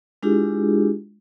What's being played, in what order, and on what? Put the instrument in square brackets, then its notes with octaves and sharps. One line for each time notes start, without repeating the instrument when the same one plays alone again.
[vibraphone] G#3 D4 E4 F4 G4 G#4